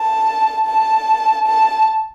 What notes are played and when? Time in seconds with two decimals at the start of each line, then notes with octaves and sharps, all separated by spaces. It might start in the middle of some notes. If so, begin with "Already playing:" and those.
Already playing: A5
0.66 A5
1.47 A5